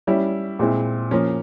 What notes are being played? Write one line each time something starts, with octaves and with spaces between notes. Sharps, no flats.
G3 C#4 E4
A#2 G#3 C4 E4
F3 A#3 C#4